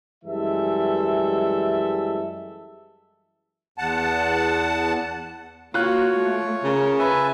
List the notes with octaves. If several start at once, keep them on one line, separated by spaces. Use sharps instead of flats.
F#2 E3 G3 G#3 A4 E5
E2 F#5 A5
A#3 F4 F#4 C#5 F#6
A3
C#3 A#4
B4 E5 G#5 A5